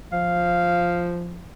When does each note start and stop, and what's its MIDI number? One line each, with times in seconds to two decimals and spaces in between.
0.13 1.48 53
0.13 1.07 77